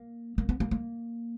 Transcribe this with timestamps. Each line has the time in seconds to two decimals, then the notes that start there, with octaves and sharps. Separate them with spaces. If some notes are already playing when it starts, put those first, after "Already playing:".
Already playing: A#3
0.38 A#3
0.49 B3
0.60 A#3
0.71 A#3